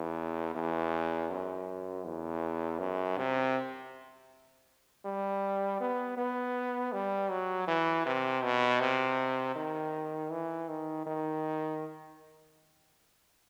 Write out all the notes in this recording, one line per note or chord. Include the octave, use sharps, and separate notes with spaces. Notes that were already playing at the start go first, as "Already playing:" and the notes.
Already playing: E2
E2
F#2
E2
F#2
C3
G3
B3
B3
G3
F#3
E3
C3
B2
C3
D#3
E3
D#3
D#3